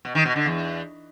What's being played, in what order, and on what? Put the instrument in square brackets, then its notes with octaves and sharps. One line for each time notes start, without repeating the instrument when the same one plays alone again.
[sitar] B2
D#3
B2
D3
E2